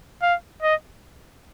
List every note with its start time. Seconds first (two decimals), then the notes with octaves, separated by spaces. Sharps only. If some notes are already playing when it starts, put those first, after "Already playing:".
0.22 F5
0.62 D#5